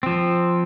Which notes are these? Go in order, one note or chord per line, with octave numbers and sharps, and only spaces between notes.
F3 C4